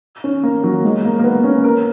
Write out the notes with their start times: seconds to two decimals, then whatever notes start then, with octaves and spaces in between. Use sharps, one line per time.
0.24 C#4
0.43 A#3
0.64 F#3
0.84 G#3
1.04 A#3
1.19 A#3
1.24 B3
1.44 C#4
1.64 A#4